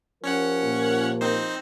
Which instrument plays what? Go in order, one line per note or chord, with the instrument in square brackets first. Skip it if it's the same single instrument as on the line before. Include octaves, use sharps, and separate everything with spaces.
[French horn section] F3 G4 A#4 [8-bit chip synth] C#4 C#5 F#5
[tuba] A#2
[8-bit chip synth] C4 D#4 C5